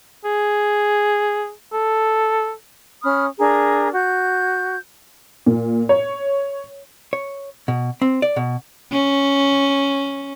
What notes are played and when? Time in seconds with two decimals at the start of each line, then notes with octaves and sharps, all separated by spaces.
0.25 G#4
1.73 A4
3.03 C#4 B5 D#6 F6
3.39 D4 G#4 A#4 A#5
3.94 F#4 G6
5.46 A#2
5.89 C#5
7.13 C#5
7.68 B2
8.02 C4
8.22 D5
8.36 B2
8.92 C#4